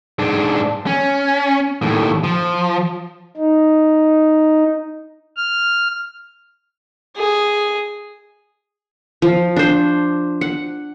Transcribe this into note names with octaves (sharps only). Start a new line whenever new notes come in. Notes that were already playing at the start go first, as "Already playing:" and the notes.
G#2 D4
C#4
D#2 A2
F3
D#4
F6
G#4
F3
D4 C5
F#5